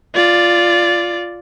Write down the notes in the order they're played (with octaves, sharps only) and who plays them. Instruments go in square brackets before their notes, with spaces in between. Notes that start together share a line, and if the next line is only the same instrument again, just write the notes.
[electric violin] F4 D5